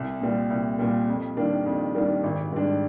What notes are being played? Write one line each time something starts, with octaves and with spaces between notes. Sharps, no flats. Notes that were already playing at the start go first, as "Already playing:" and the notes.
Already playing: C2
A#2 G3
C2
A#2 G3
F2
D#3 G3 A#3 D4
F2
D#3 G3 A#3 D4
G#1
G#2 G3 D4